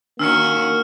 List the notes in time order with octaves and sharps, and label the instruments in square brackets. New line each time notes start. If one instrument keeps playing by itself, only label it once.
[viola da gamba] D#3 C#4 F#4 [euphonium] A#3 [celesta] D4 [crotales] E6 F6 C#7